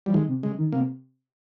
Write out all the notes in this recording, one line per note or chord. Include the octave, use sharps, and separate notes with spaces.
F3 G3
D#3 G#3
C3
C#3 G#3
D#3
C3 A#3